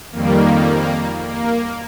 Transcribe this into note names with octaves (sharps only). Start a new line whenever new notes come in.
F2 D#3 G3 A#3
A#3